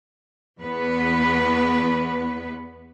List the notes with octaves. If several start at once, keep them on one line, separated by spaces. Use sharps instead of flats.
E2 B3 B4